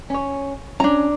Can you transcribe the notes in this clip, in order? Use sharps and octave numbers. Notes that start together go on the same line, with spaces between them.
C#4 C#5
C#4 D4 A#5